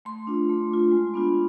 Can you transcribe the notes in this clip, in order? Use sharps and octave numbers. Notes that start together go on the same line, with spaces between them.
A3 C6
D4 F4
A3
D4 F4
G#3
B3 D4 F4